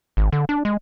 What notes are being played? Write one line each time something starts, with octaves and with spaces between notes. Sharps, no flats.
G#1
D3
D4
G#3